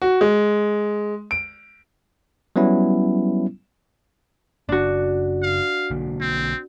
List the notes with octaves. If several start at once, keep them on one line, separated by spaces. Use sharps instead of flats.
F#4
G#3
D7
F#3 G3 B3 C#4 E4
F#1 D4 F#4
F5
B1 D3 A#3
C4